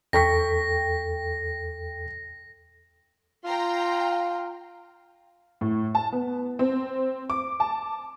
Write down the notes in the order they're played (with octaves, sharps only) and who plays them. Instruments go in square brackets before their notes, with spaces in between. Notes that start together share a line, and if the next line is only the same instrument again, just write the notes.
[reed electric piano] E2 A4 [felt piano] G5 C#6 B6 [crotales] A#6
[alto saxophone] F4 [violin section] G5 A#5 C6
[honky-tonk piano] A2
A5
B3
C4
D6
A5